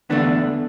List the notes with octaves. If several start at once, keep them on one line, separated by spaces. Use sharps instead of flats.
E2 D3 A3 B3 D4